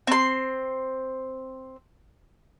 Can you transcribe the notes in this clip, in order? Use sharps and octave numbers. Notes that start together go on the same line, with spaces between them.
C4 C6